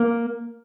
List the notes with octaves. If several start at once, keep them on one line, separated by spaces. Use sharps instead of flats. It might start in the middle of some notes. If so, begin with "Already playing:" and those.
Already playing: A#3